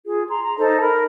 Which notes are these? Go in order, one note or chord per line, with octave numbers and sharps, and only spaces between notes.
F4 G#4
A#5 C6
A#5
D#4 A4 C5 D#5
A#4 B5